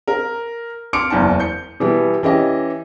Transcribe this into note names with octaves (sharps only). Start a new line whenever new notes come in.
A#4
C6 D6 F6 C#7 D7
F#1 E2 A5
G6 C#7
B2 E3 G3 B3
E3 C#4 G4 D#5